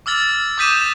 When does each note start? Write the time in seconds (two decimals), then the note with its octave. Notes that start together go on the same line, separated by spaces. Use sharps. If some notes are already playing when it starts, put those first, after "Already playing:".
0.06 D6 E6 F6 A6 F#7
0.58 D6 D#6 G6 B6 D#7 E7